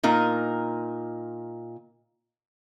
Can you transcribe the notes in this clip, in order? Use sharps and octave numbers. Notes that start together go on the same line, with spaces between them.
A#2 D#4 A#4